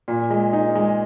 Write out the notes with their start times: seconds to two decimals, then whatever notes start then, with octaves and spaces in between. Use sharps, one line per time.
0.08 A#2
0.30 G#3
0.53 D#4
0.75 G#3